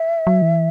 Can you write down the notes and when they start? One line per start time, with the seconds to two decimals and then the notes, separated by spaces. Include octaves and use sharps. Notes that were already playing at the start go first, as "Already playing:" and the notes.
Already playing: E5
0.27 F#3
0.42 E3